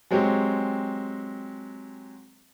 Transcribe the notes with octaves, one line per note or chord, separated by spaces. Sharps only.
F#3 G#3 C4 F#4 G4